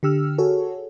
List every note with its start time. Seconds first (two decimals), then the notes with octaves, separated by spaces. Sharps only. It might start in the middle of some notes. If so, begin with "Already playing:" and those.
0.03 D3 G4 E6 F6
0.38 F#4 G#4 A4 C#5